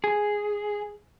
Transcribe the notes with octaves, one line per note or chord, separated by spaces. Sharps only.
G#4